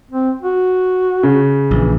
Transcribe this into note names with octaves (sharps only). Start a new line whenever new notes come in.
C4
F#4
C#3
A#1 E3